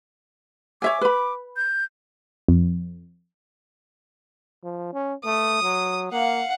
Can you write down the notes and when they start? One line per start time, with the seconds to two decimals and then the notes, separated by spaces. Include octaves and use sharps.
0.82 C#5 E5 G#5 D6
1.01 B4 B5
1.57 G6
2.48 F2
4.63 F3
4.93 C#4
5.25 A3 D#6
5.62 F#3
6.12 A#3 F5 F#5